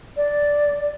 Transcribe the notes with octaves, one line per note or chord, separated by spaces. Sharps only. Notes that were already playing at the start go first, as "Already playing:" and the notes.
D5